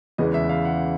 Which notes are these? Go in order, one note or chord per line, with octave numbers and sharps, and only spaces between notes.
E2 C#3 E3 G#3 B3 D#5
E5
F5
F#5